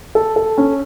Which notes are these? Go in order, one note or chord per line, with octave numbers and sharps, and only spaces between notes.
A4
A4
C#4